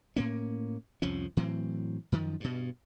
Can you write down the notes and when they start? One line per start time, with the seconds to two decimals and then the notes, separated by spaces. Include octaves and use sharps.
0.16 A2 A#3 C#4
1.02 C2 F2 F3 C#4
1.37 A2 E3 F#3 C4
2.12 F#2 D#3 F3
2.40 G2 B2